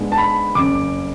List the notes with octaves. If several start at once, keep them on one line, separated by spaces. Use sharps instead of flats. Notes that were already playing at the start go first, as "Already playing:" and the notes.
Already playing: G#2 G#3 B3 D4
A5
B5
F#1 F2 C#3 D6